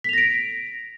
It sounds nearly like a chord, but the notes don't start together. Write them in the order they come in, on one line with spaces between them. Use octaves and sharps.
B6 F7 A#6 D7